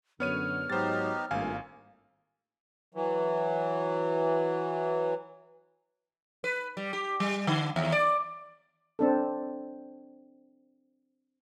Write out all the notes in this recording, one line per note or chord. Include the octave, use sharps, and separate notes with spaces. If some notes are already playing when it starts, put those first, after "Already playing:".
F#2 D3 B3 C#5 F6 D#7
G#2 F#3 B3 D#4 G4 C5 A6
G#1 G2 A#2 A3 A#3 F4 F5 G#5
E3 F#3
B4
G3
G4
G3
D3
D#2
D5
C4 D4 A4